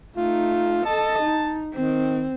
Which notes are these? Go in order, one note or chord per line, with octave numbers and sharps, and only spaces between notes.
A3 D#4 F4
A4 D#5 A5
D#4
D#3 C4